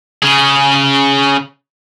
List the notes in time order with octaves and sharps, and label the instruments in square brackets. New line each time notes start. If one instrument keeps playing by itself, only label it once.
[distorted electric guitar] C#3 G#4